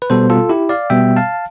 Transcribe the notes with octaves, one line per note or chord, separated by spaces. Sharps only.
B4
B2 G3 B3 A4 C5
F4 A4
E4 G4
D5 F5
B2 G3 B3 E5 G5
F5 A5